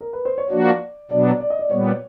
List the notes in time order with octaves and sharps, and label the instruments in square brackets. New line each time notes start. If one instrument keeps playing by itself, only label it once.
[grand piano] A#4
B4
C5
C#5
[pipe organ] F3 A#3 D4 F#4 [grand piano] D5
[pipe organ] B2 F#3 B3 D4 [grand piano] D5
[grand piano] D5
D#5
D5
[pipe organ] A#2 G3 B3 [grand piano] C#5